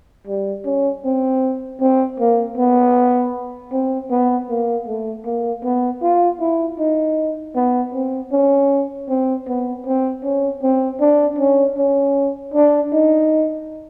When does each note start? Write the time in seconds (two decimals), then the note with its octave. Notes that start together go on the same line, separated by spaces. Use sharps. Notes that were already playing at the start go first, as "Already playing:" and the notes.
0.27 G3
0.65 C#4
1.05 C4
1.80 C4
2.20 A#3
2.57 B3
3.72 C4
4.11 B3
4.50 A#3
4.88 A3
5.26 A#3
5.64 B3
6.03 F4
6.40 E4
6.79 D#4
7.56 B3
7.94 C4
8.32 C#4
9.09 C4
9.48 B3
9.86 C4
10.23 C#4
10.63 C4
11.00 D4
11.38 C#4
11.77 C#4
12.54 D4
12.93 D#4